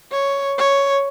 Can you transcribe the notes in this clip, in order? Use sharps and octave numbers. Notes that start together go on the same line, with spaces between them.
C#5
C#5